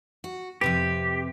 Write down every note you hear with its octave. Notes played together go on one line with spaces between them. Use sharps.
F#4
F2 C3 G4 B4